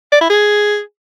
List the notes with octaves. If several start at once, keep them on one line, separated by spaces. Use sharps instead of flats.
D5
E4
G#4